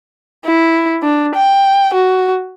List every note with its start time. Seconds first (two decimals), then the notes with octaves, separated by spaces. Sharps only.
0.46 E4
1.02 D4
1.35 G5
1.94 F#4